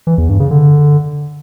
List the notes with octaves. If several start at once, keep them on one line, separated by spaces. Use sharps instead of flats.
E3
E2
G2
C#3
D3